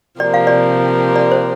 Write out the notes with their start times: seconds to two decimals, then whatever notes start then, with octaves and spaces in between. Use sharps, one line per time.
0.20 C3 F3 A#3 G4 D5
0.34 F5
0.47 D5
1.16 D5
1.31 C5